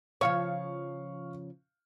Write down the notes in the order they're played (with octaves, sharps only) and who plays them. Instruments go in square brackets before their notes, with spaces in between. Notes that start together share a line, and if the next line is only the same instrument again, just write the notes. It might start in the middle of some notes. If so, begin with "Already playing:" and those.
[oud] C#3 F3 C#5 [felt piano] F5 C#6